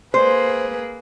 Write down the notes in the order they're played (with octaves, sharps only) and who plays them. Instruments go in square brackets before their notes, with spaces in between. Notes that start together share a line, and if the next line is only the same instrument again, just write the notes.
[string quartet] A#3 G#4 B4 [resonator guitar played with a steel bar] C5